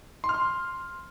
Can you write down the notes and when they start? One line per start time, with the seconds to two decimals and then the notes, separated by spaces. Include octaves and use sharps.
0.24 C6
0.29 F6
0.34 C6